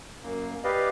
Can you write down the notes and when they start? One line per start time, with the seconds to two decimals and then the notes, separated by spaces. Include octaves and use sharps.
0.23 F#2 A#3
0.64 G4 B4 D5 D#5 F5